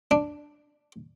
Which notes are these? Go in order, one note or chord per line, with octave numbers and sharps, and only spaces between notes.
D4